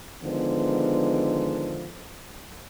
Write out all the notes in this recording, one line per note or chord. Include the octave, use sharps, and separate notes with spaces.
D3 D#3 F3 G#3 B3